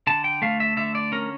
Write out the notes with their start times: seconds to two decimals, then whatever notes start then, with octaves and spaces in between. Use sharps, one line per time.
0.07 D3 A5
0.24 G5
0.42 A3 F5
0.60 E5
0.77 D3 E5
0.95 D5
1.12 C#4 A#4